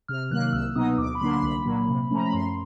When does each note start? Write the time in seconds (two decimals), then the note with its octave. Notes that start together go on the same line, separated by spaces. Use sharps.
0.08 C3 F6
0.31 D#3 F#3 A#3 F#6
0.53 C2 E6
0.75 B2 F#3 B3 D#4 D#6
0.98 D2 D6
1.15 B5
1.21 D3 F#3 A#3 D4 C6
1.33 C6
1.43 C2 B5
1.65 A#2 F#3 A#3
1.88 C3
2.11 F3 A3 C#4 A#5
2.24 B5
2.33 F#2 C6